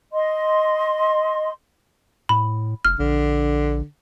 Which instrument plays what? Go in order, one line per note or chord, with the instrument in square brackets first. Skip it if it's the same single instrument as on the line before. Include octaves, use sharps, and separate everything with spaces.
[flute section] D#5 C6
[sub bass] A2 [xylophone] B5
[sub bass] F1 [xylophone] F6
[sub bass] A#1 [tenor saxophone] D3